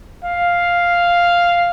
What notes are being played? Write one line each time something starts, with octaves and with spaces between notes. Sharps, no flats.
F5